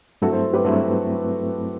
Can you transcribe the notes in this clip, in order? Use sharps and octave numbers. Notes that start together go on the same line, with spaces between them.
G2 F#3 A3 C4 E4 F#4 A4
A4 C5
G4 B4
G2 F#3 A3 C4 E4 F#4 A4